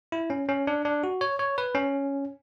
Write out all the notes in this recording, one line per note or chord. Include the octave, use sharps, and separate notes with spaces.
E4
C#4
C#4
D4
D4
F#4
C#5
C#5
B4
C#4